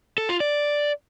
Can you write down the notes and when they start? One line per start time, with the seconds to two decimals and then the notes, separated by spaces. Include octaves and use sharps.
0.18 A4
0.29 F4
0.40 D5